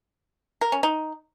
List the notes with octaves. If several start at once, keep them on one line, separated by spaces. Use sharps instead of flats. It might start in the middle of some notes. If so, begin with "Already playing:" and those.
A#4
C#4
D#4